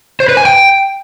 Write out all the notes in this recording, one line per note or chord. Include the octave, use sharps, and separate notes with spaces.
C5
B4
G#5
G5